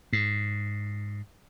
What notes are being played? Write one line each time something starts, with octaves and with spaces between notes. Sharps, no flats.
G#2